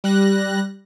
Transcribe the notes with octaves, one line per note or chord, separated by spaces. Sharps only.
G3 F#6 A#6